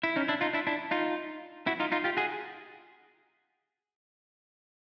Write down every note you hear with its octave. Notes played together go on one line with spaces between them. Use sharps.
E4
C#4 D#4
D4 E4
D#4 F4
D4 E4
D4 E4
D#4 F4
E4 F#4
D#4 F4
D#4 F4
F4 G4
F#4 G#4